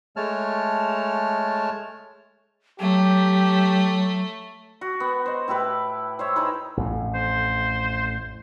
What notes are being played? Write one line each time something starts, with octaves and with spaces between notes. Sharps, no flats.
G#3 A3 C#5 A5 F6
F#3 A3 G4
F#4
B3
C5 D#5
A2 E4 G4 B4
C5 C#5 E5
D#4 E4 G#4 B4
A1 F2 A2
C5